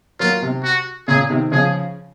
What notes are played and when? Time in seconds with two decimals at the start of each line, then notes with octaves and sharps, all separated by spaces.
0.20 F#3 A#3 F4
0.42 C3
0.64 F#4
1.08 A#2 C#3 G#4
1.30 C3 D#3
1.52 C#3 F3 G#4